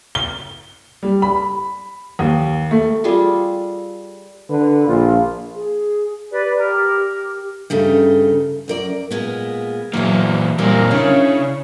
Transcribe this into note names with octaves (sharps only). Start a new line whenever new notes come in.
G7
G3
B5
D#2
A3
G3 F4 G#4 A4
D3 B4
A#1 F4
G#4
G4 B4 D5
A#4
G2 C#3 A3 D#4
F#2 A#4 D5
A#2 G#3 B3
A#2 E3 F#3 A#3 B3
A#2 G3 A#3 C4 A#4 F5
C#3 C#4 D4 E4 C#5